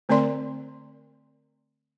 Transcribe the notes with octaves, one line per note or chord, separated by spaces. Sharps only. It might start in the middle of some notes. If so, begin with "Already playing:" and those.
D3 A3 C4 A#4 D5 C6